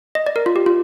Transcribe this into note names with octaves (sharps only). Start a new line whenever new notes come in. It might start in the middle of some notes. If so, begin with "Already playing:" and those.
D#5
D5
A#4
F4
G4
F4